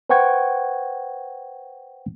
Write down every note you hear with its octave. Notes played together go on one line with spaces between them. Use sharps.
B4 C5 F#5 G5 C#6 G#6